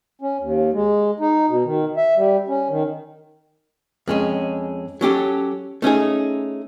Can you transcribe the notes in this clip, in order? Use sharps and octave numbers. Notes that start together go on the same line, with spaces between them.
C#4
D#2
G#3
D#4
B2
D#3
E5
G3
C#4
D#3
F2 G#3 C#4
F#3 C#4 G4 A4
A3 C#4 D#4 G#4